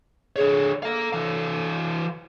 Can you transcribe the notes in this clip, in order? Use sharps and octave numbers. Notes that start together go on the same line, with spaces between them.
D3 G#4 C#5
A4 F5 A#5
E3 F5